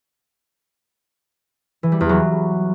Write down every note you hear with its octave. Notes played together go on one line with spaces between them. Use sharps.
E3
G3
E2
F#3